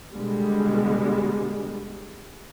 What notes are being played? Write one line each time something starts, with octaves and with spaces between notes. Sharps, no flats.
B2 D3 G3 G#3